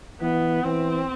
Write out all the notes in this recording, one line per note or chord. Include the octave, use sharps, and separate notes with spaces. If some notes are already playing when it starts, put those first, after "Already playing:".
E3 B3
E3 C4